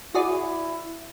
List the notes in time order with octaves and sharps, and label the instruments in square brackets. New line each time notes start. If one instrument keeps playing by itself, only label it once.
[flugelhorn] E4 [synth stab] F#4 G#4 D5